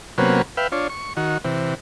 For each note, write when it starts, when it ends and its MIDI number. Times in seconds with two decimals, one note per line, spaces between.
0.18 0.42 48
0.18 0.42 54
0.18 0.42 58
0.18 0.42 59
0.18 0.42 61
0.57 0.67 71
0.57 0.67 76
0.57 0.67 77
0.57 0.67 79
0.72 0.88 62
0.72 0.88 65
0.72 0.88 73
0.90 1.13 85
1.17 1.38 51
1.17 1.38 66
1.44 1.75 48
1.44 1.75 52